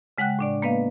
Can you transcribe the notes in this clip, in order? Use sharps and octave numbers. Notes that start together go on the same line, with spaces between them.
C#3 G#3 F#5 G5 F#6
A2 D4 D5
A#3 B3 B4 D#5 F5